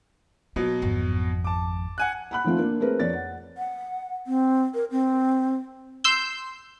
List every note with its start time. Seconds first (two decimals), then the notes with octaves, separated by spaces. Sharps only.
0.56 B2 F#3 A#3
0.82 G#1 F2
1.44 A5 D6
1.98 F#5 G#5 F#6
2.31 F#5 B5 F#6
2.44 D#3 F3 A3 C4 F4
2.58 A#3 D4
2.80 A3 C4 G#4 A#4 B4
3.00 F2 C#5 D5 A6
3.13 F#5
3.58 F#5
4.27 C4
4.74 A#4
4.91 C4
6.04 C6 E6 G6